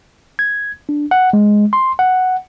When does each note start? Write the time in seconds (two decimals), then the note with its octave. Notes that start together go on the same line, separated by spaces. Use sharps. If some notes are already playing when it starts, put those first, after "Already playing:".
0.39 G#6
0.89 D4
1.11 F#5
1.33 G#3
1.73 C6
1.99 F#5